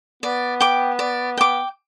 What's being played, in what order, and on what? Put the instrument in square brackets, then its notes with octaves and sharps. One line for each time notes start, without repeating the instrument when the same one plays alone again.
[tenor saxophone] B3 [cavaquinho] D5
[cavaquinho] G5 D6
D5
G5 D6